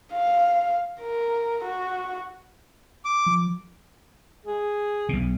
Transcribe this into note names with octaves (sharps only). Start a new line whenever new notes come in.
F5
A#4
F#4
D6
F3
G#4
B1 B2